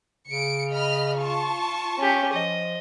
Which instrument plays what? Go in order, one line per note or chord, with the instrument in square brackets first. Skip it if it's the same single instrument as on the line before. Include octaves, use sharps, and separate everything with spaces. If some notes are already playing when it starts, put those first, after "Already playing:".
[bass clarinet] C#3 [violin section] C#7 D7
[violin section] D#5 B5 F6
F4 A5 C#6
[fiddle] C#4 G4
[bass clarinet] F3 [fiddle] D#5